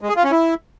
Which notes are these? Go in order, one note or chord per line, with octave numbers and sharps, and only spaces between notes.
G#3
G#4
F4
C#4
E4